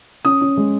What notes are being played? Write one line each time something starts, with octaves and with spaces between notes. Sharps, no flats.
C#4 D#6
C#4
G#3